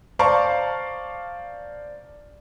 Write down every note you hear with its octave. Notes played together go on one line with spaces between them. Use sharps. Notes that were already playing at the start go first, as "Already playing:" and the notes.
C5 D5 F5 A5 A#5 C#6